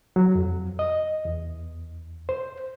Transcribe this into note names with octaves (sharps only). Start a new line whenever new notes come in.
F#3
F2
D#5
E2
C5